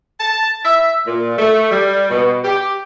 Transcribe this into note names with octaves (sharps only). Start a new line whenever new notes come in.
A5
E5
A#2
A3
G3
B2
G4